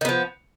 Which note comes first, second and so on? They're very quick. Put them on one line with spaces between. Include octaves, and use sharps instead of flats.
D#3 B3 F3